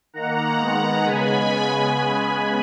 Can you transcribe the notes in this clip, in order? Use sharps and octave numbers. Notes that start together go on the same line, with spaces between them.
D#3 A#3 F#5 A#5
D#3 G#3 B3 F#5 A#5
C#3 G#3 B3 G#5 B5